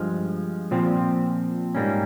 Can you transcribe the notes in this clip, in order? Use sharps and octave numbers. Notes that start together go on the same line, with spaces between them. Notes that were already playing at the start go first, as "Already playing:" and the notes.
Already playing: G2 F3 G#3
A#2 F3 C4
G#2 G3 A#3 C#4